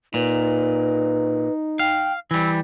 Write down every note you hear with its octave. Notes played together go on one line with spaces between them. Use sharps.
A#2 D#4 B4
F5 G5
E3 G3 E6